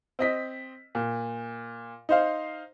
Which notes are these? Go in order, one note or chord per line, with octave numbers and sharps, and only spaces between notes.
C4 D#5 B6
A#2
D#4 C5 F5